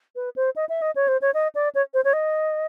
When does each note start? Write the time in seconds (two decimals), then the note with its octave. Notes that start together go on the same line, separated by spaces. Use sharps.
0.16 B4
0.36 C5
0.56 D#5
0.69 E5
0.82 D#5
0.96 C#5
1.08 C5
1.22 C#5
1.34 D#5
1.55 D5
1.75 C#5
1.94 C5
2.04 C#5
2.13 D#5